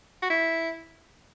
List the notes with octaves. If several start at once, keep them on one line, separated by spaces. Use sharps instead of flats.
F#4
E4